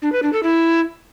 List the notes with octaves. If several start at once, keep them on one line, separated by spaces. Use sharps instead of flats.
D4
B4
D4
A4
E4